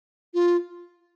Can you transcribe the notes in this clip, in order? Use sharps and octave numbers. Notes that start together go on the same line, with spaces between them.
F4